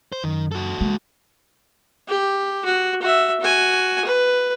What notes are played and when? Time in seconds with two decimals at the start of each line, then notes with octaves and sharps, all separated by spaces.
0.12 C5
0.24 F#2 D#3
0.52 F#4 A4
0.81 G#3 A#3
2.08 G4
2.65 F#4
3.02 F#4 E5
3.40 F#4 G#5
4.05 B4